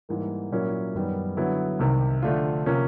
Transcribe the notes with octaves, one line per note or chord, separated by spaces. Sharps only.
G#2 E3 G3 A#3
A#2 F#3 A#3 C#4 E4
F#2 D#3 G3 B3
D3 F#3 B3 E4
C2 C3 D#3
D3 F3 A3 D4 F4
C3 F3 A#3 C#4